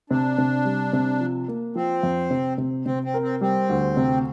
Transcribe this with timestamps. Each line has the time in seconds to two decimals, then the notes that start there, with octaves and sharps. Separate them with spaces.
0.10 C3 D4
0.38 C3
0.65 G3
0.93 C3
1.20 F3
1.48 A#3
1.75 F3 C4
2.03 F2
2.30 C3
2.58 C3
2.86 C3 C4
3.04 C4
3.14 A#4
3.22 C4
3.41 G3 C4
3.69 D2
3.97 C3